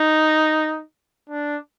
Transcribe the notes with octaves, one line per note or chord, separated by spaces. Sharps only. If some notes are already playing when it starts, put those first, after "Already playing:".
Already playing: D#4
D4